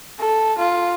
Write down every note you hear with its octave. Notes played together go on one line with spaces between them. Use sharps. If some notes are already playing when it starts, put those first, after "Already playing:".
A4
F4